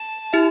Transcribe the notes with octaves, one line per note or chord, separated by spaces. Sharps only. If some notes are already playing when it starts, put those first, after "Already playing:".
Already playing: A5
E4 G4 E5